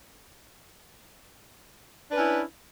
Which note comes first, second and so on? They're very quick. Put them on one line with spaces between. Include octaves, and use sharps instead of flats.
D4 B4 C#4 E4